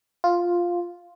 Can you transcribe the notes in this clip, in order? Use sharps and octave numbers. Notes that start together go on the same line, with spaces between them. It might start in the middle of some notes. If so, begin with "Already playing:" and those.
F4